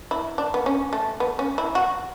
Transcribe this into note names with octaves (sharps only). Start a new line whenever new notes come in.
E4
D4
B3
C#4
A3
B3
C#4
E4
F#4